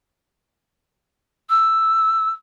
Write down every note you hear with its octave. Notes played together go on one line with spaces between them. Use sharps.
E6